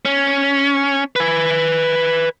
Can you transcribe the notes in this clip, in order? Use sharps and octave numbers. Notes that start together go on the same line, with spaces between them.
C#4
B4 G#5